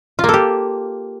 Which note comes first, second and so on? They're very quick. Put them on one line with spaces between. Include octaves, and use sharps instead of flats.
F4 A#3 A4 G4